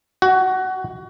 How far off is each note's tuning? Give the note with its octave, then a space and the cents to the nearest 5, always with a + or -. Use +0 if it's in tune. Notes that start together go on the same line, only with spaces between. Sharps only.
F#4 +20